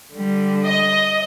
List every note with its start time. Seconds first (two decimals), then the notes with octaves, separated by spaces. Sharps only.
0.13 D3 G3
0.63 D#5